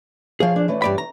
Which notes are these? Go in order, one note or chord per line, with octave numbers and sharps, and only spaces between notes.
F3 G#4 C#5 F5
D4
E3 A3 C#4
G2 D5 B5
A#5